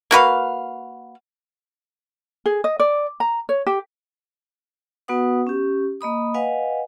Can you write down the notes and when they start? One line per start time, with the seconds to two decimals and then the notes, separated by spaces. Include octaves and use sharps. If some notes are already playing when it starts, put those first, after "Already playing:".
0.11 A#3 F#4 B4 F5
2.46 G#4
2.64 D#5
2.80 D5
3.20 A#5
3.49 C#5
3.67 G4
5.08 B3 F#4 B4 F#5 D#6
5.47 C#4 G4
6.01 A#3 D#5 B5 D#6
6.34 B4 D#5 F5 F#5 G#5